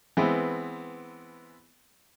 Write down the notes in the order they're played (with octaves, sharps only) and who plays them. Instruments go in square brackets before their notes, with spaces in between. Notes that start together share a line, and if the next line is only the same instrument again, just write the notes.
[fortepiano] E3 G#3 B3 C4